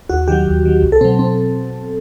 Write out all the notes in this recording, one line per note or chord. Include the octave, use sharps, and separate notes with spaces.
D#2 F#4
D#3 F#3 G4
D#2
D#3 F#3
C2
A4
B2 F#3 C4
C4